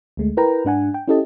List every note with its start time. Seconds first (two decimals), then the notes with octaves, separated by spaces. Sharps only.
0.17 D2 G#3 A3
0.37 E4 A#4 B4 G5 A#5
0.65 G#2 D4 F#5 G#5
0.94 G5
1.08 C#4 E4 G4 A4 D#5 A5